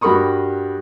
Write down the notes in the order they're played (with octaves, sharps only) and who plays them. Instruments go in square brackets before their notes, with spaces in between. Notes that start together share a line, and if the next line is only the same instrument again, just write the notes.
[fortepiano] G2 F#4 A#4 B5 C#6 D#6